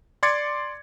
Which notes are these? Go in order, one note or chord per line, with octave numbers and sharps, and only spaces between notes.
D5 C6 D6 G#6 A6 C#7